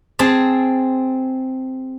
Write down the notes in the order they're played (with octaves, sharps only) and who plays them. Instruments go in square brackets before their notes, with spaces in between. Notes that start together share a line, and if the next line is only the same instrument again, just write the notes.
[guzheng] C4 G#4 A5